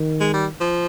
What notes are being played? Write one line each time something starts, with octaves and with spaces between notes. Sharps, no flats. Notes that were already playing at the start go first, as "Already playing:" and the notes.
Already playing: D#3
G#3
G3
F3